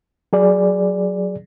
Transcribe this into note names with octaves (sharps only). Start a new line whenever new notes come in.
F#3 G#4 D5